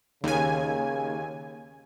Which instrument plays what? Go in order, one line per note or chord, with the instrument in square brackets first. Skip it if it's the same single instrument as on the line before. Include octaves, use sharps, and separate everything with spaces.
[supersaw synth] D#2 G#5 [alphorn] C#3